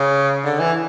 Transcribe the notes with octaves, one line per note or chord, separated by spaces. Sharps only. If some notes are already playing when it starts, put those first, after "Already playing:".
Already playing: C#3
D3
E3